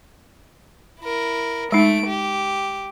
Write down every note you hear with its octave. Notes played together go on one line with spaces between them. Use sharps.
E4 A#4
G#3 A3 D#4 D7
G4